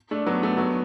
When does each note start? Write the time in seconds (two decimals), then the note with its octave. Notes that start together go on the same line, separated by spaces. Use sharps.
0.11 A3 D4
0.26 F#3 B3
0.43 A3
0.57 F#3 B3